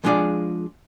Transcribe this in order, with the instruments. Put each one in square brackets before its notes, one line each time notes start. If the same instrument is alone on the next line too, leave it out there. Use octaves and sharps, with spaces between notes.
[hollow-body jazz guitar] F3 G#3 D4 F4 G#4 D5